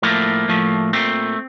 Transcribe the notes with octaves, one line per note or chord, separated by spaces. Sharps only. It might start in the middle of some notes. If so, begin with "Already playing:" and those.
A2 F3 A3 A#3
A2 F3 A3
A#2 A3 C4